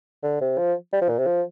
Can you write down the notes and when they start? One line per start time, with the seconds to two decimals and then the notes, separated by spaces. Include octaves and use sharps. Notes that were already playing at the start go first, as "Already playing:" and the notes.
0.23 D3
0.41 C3
0.58 F3
0.93 G3
1.02 F3
1.09 A#2
1.19 C3
1.27 F3